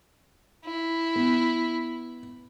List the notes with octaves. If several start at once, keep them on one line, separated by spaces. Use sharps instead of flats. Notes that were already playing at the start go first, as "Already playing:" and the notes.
E4
B3